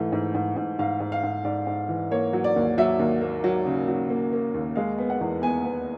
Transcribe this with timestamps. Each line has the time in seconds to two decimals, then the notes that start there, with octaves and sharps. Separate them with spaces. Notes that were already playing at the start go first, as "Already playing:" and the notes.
Already playing: G#2 E3 A3
0.12 G#2
0.35 G#2
0.56 G#2
0.79 G#2 F5
1.00 G#2
1.12 F5
1.23 G#2
1.44 G#2 D5
1.67 G#2
1.89 E3
2.11 A#3 C#5
2.33 F#3
2.44 D5
2.56 D#2
2.78 F#3 E5
2.99 D#2
3.21 A#3
3.44 F#3
3.66 C#3
3.88 F#3
4.10 A#3
4.33 A#3
4.54 D#2
4.76 G#3 F5
4.98 B3
5.10 F#5
5.21 E2
5.42 B3 G#5
5.64 B3